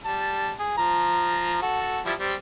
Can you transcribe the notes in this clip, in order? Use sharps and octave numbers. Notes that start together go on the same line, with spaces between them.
G3 A5
G#4
F3 A#5
F#4 A4
F3 G3 E4
G3 C4